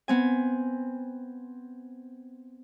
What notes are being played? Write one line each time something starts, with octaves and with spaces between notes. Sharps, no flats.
B3 C4 G#5